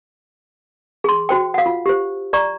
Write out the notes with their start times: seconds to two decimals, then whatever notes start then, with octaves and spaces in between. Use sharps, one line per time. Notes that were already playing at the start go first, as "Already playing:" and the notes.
1.04 G#4 C6
1.29 F#4 C5 G5
1.54 F5 F#5
1.66 F4
1.86 G4 C5
2.33 D5 A#5 C#6